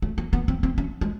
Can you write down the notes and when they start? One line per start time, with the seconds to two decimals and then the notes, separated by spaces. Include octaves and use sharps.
0.02 A3
0.18 A#3
0.33 B3
0.48 C4
0.63 C4
0.78 C#4
1.01 G#3